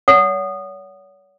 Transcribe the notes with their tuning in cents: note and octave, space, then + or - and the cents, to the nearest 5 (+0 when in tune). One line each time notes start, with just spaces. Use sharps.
C#5 +35 F#5 +0 D#6 -20